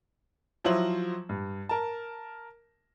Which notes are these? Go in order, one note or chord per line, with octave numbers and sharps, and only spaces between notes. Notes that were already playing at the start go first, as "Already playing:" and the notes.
F3 F#3 E4 F4 C5 F#7
G2
A#4 A5